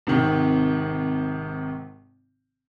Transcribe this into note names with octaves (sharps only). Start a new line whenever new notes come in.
G#1 C3 D#3